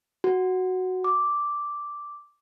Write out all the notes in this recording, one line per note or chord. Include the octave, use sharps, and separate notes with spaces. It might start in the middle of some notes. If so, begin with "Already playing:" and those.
F#4
D6